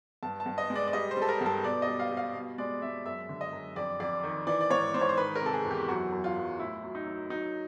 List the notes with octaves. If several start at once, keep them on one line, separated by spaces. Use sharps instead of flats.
G2 A5
A5
G2
D#5
G#3
D5
D5
G3 D#5
C5
G3 A4
A#4
G2
A4
B2 D5
G3 D#5
F5
G3
F5
B2
G#3 D5
G#3 E5
F#2 E5
D3
D#5
F#2
F2 D5
F2 D5
D#3
E3 D5
D5
G#2 C#5
G#2 C5
C#5
C5
D#3 B4
A#4
C3 A4
G#4
E2
G4
F#2 F#4
F#2
F4
F#2
A2 E4
F#3
D#4
F#3
F#3 D#4